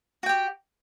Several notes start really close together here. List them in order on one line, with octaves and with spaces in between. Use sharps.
F#4 G5 G4